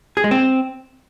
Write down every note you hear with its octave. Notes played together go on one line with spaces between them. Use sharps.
G#4
G#3
C4